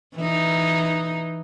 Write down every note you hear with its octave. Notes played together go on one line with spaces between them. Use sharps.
E3 D#4